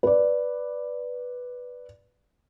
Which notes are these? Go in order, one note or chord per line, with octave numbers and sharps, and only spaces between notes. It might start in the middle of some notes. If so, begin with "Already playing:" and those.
B4 D5